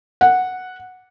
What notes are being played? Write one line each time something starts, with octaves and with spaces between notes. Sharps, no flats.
F#5